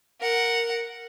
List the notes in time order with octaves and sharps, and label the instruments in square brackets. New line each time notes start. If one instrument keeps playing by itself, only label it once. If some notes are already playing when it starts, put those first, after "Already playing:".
[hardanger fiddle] A#4 F#5